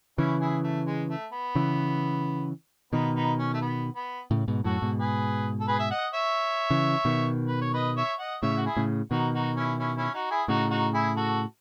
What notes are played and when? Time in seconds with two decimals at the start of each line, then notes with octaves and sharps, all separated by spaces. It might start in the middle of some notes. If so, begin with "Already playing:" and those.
0.18 C#3 E3 C#4 E4
0.41 E4 G#4
0.64 A3
0.87 G#3
1.10 A3
1.33 B3
1.55 C#3 E3
2.93 B2 D#3 B3 D#4
3.15 B3 D#4
3.39 C#4
3.54 A3
3.61 B3
3.96 B3
4.31 A2 C#3
4.48 G#2 B2
4.64 F#2 A2 F#4 A4
4.82 G#2 B2
4.99 G#4 B4
5.60 A4
5.68 G#4 B4
5.79 E5
5.90 D#5 F#5
6.14 C#5 E5
6.70 C#3 E3
7.05 B2 D#3
7.48 B4
7.61 C#5
7.73 B4 D#5
7.97 C#5 E5
8.19 D#5 F#5
8.42 A2 C#3 C#5 E5
8.57 F#4
8.66 E4 G#4
8.77 A2 C#3
9.11 B2 D#3 D#4 F#4
9.35 D#4 F#4
9.56 C#4 E4
9.79 C#4 E4
9.97 C#4 E4
10.14 D#4 F#4
10.31 E4 G#4
10.48 A2 C#3 D#4 F#4
10.71 D#4 F#4
10.94 E4 G#4
11.17 F#4 A4